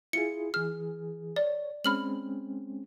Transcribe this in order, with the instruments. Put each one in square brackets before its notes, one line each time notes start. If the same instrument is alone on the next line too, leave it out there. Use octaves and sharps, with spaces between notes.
[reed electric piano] E4 F4 G#4 [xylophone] C#7
[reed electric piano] E3 G#4 [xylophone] F6
[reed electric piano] C#5 [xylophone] D5
[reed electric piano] G#3 C4 C#4 [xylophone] B5 F6 F#7